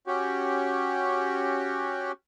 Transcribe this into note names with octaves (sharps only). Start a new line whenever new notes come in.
C#4 F#4 G4